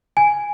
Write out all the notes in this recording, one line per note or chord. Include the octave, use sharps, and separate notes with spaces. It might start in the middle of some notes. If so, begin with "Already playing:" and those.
G#5